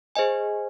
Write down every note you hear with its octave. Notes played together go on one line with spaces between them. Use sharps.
G#4 C5 D#5 G#5